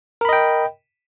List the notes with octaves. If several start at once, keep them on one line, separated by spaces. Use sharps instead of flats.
A#4 D#5 G5 B5